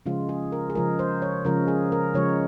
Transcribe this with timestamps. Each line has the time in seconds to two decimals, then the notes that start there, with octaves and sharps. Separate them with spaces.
0.06 C#3 F3 G#3 F4
0.29 G#4
0.52 A#4
0.70 G#4
0.75 C#3 F3 G#3 A#4
0.99 C5
1.22 C#5
1.45 C#3 F3 G#3 A#4
1.68 G#4
1.92 A#4
2.14 C#3 F3 G#3 C#5